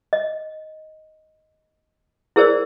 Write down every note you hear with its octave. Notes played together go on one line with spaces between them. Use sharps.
D#5
E4 G#4 A#4 C5 D5 E6